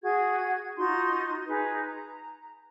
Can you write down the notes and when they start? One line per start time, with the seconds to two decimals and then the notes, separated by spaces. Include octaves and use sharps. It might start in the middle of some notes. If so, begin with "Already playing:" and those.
0.02 F#4 G#4 G#6
0.77 D#4 F4 F#4 C6
1.47 D#4 G#4 B4
1.85 A#5